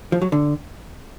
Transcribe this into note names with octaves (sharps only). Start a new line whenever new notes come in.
F3
F#3
D3